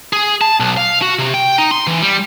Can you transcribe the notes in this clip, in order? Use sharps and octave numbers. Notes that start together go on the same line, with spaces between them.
G#4
A5
B1
F5
F#4
C3
G5
D#4
C6
E3
G3